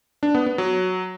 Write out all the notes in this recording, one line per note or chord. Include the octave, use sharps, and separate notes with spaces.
D4
B3
B3
F#3